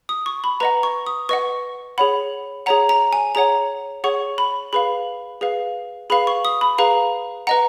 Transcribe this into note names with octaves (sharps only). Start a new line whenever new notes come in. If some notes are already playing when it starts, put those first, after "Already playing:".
D#6
C#6
B5
B4 D#5 F#5 A#5
C#6
D#6
B4 D#5 F#5 C#6
G#4 C#5 F#5 B5
G#4 C#5 F#5 A#5
A#5
G#5
G#4 C#5 F#5 A#5
G#4 C#5 F#5 C#6
B5
G#4 B4 F5 B5
G#4 B4 F5
G#4 B4 F5 B5
C#6
D#6
B5
G#4 B4 F5 A#5
B4 D#5 F#5 A#5